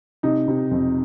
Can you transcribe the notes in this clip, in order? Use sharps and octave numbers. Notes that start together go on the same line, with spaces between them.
C3 D#4
C3
F2